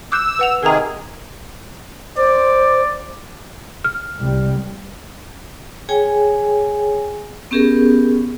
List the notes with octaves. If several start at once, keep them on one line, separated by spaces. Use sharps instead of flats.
D6 E6 F#6 G6
B4 F#5 F7
C3 D#3 G#4 A#4 A#5
C5 D5
F6
C2 G3
G#4 C#5 G5 G#5
B3 C#4 G4 G#4 A#4